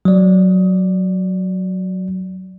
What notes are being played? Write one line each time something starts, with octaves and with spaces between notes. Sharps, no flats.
F#3 D5